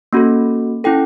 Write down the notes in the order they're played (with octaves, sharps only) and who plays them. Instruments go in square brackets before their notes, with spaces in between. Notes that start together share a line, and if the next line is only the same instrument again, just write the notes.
[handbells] A#3 C#4 F#4 A4
C#4 E4 A4 G5